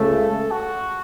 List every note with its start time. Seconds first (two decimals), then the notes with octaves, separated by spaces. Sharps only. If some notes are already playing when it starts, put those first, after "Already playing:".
Already playing: C#2 C#3 A3 A4
0.51 F#4